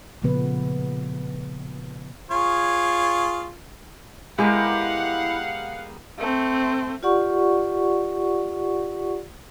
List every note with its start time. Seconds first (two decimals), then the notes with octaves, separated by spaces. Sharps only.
0.22 A#2 C#3 F3 A3 B3 B4
2.31 F4 G#4 C#5
4.39 G#3 B3 E4 G4 A#4 F5 F#5
6.19 A3 C4
7.03 F4 G4 D5 F#5 C#6